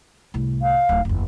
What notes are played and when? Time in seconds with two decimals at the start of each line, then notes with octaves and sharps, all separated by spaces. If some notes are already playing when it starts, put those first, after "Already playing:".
0.34 C2 A2
0.62 F5
0.89 D1 D#3
1.05 F#1 E2